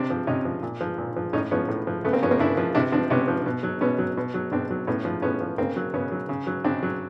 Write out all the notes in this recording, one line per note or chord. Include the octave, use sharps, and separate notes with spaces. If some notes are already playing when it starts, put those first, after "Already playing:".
Already playing: C3 C4 D4
F3
C3 C#4 D#4
F3
A#2
F3
A#2
F3
A2 C#4 D#4
F3 B3 C#4
A2
F3
C#3 A3 B3
A#3 C4
F3 B3 C#4
A#3 C4
C#3 D4 E4
F3
C3 D4 E4
F3 C4 D4
C3 B3 C#4
F3
B2
F#3
B2 B3 C#4
F#3
B2
F#3
B2 C4 D4
F#3
A2 B3 C#4
F3
A2 B3 C#4
F3
C#3 A#3 C4
F#3
C#3 B3 C#4
F#3
C#3
F#3
C#3 C4 D4
F#3